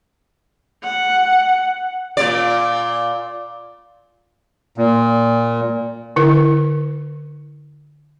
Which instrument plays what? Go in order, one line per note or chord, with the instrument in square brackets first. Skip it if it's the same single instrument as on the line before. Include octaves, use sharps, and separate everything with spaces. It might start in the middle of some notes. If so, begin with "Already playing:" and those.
[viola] F#5
[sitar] A#2 D5
[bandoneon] A#2
[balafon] D3 E4 A#4